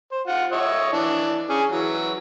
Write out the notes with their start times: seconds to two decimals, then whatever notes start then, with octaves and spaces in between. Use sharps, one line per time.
0.12 C5
0.27 F4 F#5
0.52 C#5 D#5 E5
0.93 E3 D4
1.50 C#4 G#4
1.72 E3 F#3